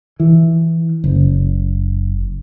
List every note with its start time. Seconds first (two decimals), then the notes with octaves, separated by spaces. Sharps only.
0.20 E3
1.04 F#1